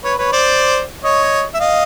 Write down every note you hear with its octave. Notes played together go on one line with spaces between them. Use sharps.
B4 C#5
B4 C#5
C5 D5
C#5 D#5
E5
D#5 F5